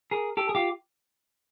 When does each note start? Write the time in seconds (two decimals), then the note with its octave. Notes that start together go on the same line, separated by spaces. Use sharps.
0.11 G#4 A#4
0.37 G4 A4
0.49 G#4
0.55 F4 G4